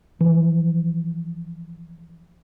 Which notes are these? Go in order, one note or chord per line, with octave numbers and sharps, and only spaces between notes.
E3 F3